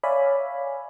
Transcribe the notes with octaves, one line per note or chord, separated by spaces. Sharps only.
C#5 D5 E5 F5 G#5 B5